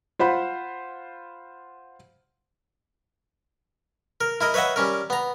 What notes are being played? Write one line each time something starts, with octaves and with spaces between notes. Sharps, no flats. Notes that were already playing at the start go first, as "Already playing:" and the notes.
F4 C5 F#5 B5
A#4
E4 A#4 D#5
B4 C#5 D#5 E5 F#5
G3 C#4 A#4
B3 A#5